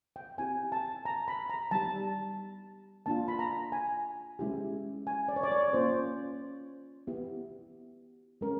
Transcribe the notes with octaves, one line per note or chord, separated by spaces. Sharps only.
G5
C4 E4 G4 G#5
A5
A#5
B5
A#5
G3 B3 D#4 G4 A5
A#3 D4 F4 A5
B5
A#5
G#5
G#3 C#4 E4 G4
G#5
D5
C#5
D5
C#5
A#3 C#4 F4 C5
B3 E4 G4
G#3 C#4 A#4